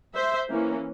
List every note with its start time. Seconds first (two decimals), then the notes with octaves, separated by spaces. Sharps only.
0.15 C5 E5
0.50 E3 A#3 C#4